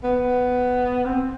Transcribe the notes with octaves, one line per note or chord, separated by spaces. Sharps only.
B3
C4